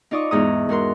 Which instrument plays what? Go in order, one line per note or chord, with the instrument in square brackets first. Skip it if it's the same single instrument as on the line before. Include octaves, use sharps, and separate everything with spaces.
[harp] D#4 F4 D5 C#6 D#6
E2 G#2 A#5 D#6
G#2 F#4 A#4 C6